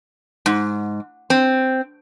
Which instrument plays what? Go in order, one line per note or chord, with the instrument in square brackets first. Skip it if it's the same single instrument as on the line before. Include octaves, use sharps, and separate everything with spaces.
[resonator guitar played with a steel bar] G#2
C4